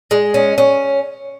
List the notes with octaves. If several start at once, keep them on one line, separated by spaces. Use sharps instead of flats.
G#3
C#4
C#4